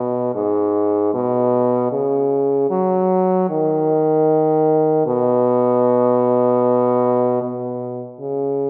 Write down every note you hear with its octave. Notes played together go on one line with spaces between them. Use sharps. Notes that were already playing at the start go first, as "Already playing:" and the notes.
Already playing: B2
G#2
B2
C#3
F#3
D#3
B2
B2
C#3